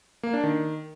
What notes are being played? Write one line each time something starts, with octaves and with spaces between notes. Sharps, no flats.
A#3
D4
D#3